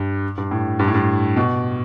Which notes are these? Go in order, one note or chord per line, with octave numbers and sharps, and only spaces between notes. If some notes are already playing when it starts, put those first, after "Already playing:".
Already playing: G2
G2
A2
G2
A2
G2
B2